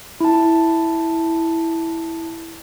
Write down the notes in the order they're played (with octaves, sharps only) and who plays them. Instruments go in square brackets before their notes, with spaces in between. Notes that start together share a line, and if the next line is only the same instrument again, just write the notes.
[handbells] E4 A5